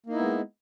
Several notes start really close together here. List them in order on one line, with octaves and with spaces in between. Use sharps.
A#3 D#4 E4 B3 G#3